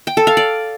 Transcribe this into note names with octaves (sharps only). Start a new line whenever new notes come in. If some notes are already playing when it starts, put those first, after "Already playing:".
G5
A4
F5
D5